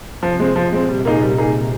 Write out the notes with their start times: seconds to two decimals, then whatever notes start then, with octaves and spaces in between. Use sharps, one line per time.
0.23 C3 F3
0.40 G#3 C4
0.56 A#2 F3
0.73 G#3 C4
0.89 G3
1.05 A#3 D#4 G#4
1.21 G3
1.38 A#3 D#4 G#4